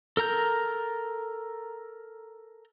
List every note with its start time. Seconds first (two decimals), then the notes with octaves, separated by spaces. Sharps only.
0.17 A4 A#4 A#5 G6